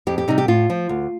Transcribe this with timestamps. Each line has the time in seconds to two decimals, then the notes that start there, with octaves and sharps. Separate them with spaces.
0.07 F2 G4
0.18 G4
0.28 C3 G3 D#4
0.38 G4
0.48 A2 F4
0.70 F3
0.89 D2